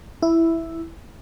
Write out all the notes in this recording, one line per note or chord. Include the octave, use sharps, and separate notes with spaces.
E4